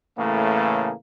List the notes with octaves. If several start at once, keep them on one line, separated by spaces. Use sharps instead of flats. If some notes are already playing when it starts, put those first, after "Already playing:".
A2 C#3 E3 A3 A#3